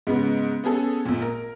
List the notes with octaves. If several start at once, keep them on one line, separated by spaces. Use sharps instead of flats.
G#2 C#3 B3
B3 C#4 G#4 A4
G#1 A#2
A#4